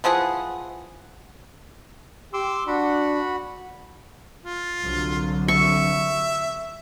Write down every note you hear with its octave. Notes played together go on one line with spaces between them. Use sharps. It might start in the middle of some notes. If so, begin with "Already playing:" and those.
E3 F3 G#4 F#5
G4 C6 D6 E6
D4 F#4 F#5 B5
F4
C2 D3 F#3
E5 C#6